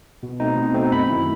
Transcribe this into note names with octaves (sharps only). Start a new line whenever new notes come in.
B2
A3 C4 D#4
B2
A3 C4 D#4
F#2 B5
D#3 A3 E4